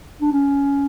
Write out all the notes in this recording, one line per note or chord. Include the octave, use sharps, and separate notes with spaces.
D4
C#4